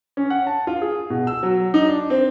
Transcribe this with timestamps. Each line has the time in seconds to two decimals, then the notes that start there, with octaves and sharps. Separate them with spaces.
0.17 C#4
0.30 F#5
0.47 A5
0.67 F4
0.82 G#4
1.10 B2
1.27 E6
1.43 F#3
1.74 D#4
1.88 D4
2.10 C4